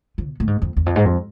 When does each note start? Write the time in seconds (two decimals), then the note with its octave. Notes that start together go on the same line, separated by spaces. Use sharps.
0.18 F3
0.27 B2
0.40 A2
0.47 G#2
0.62 F2
0.77 E2
0.86 F2
0.96 G#2
1.05 F2